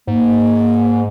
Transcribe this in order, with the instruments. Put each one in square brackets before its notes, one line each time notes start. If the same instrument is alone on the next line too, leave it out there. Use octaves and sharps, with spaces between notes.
[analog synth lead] G#2 [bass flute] A#3